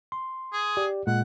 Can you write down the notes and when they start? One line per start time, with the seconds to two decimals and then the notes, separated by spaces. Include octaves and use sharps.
0.12 C6
0.52 G#4
0.77 G4 D5
1.07 A#2 G#3 F#5